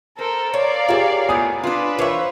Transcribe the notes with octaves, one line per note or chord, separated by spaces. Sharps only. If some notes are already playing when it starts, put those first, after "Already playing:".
A4 A#4 C5
A#4 C#5 D5 F5
F4 G4 G#4 C#5 E5
A2 B3 G#5 D#6
D4 F4 B4
E3 A#4 C5 C#5 E5 F5